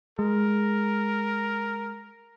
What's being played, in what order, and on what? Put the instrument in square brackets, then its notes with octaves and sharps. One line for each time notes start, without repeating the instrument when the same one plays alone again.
[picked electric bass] G#3 [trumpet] A#4